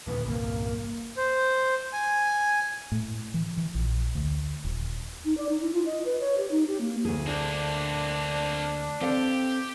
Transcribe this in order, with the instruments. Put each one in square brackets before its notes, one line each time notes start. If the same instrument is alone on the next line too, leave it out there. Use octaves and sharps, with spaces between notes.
[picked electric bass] D#2 A#2 D3 [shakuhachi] B4
[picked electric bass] G1 C2 [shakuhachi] A#3
[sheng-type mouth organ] C5
G#5
[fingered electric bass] A2
E3
E3
A#1
D2
D#1
[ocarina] D#4
D5
D#4
E4
F4
D#5
B4
C#5
G4
D#4
G4
A#3
[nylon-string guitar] D2 G#4
[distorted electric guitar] A#3 C4 [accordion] D4
[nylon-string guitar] C4 A4 F5 [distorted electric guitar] G4